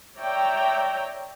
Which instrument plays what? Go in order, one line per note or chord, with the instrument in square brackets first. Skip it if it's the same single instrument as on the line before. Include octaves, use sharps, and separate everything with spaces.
[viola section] C#5 D5 E5 G5 A#5